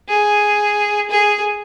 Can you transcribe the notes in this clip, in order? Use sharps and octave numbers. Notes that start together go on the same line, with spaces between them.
G#4
G#4